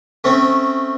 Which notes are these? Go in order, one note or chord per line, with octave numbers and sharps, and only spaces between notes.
A3 C4 C#4